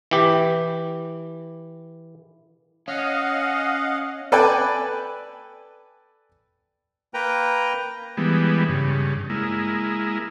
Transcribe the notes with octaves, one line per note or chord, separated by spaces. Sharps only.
E3 G4
C#4 D#5 F5 F#5
A4 B4 D5 G5 G#5
A#3 B4 G5 A#5
E3 G3 G#3 B3
G2 C#3
G#3 A#3 E4